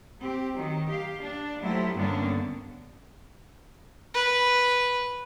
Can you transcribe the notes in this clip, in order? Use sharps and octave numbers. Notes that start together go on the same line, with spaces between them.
C4 G4
D#3 F#3
G4 F5
D4
F3 F#3 A3 E4 G4
G2 D3 A#3 B3 C#4 D4
B4